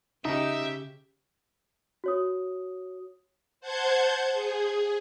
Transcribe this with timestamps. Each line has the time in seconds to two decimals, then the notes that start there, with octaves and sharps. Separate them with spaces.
0.25 C#3 D#4 G4 E5
2.04 F#4 C#5 D#6
3.60 C5 F#5 A5 G6 G#6
4.32 G#4